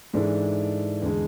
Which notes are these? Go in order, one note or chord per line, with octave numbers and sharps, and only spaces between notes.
G#2 E3 G#3 D4 A4
E2 D3 G#3